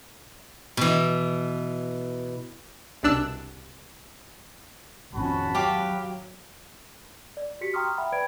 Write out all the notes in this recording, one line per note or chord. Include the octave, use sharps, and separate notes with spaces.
B2 E3
C2 B2 D4 E6 F#6
G#1 F2 C#4 F#4 A5 B5
F#3 G4 F5
D5
F#4 G4 B6 C#7
G5 A#5 C6 C#6 D#6 F6
E5 F#5 G5 B5
B4 D5 G5 B5 G#6 D7